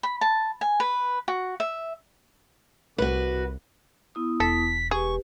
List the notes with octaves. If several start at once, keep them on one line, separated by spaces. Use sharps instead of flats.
B5
A5
G#5
B4
F#4
E5
C2 F#4 B4
B3 E4 D#6
E1 A4 B6
G4 G#4 B4 C#6